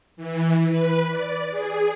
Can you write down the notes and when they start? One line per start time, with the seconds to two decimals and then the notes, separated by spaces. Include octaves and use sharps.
0.17 E3
0.69 B4
1.10 D5
1.50 G#4